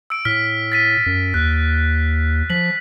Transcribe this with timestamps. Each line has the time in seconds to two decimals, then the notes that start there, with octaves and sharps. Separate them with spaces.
0.10 E6 D7
0.25 A2 F6 B6
0.72 A6 B6 D#7
1.06 F#2
1.34 D#2 F#6
2.50 F3 B6 F#7